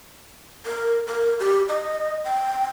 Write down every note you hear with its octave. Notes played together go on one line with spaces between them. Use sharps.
A#4
A#4
G4
D#5
G5